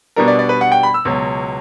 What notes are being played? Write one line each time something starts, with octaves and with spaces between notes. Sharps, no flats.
B2 G3 B3 D4 A#4
D5
D5
B4
F#5
G5
B5
E6
C#2 B2 F#3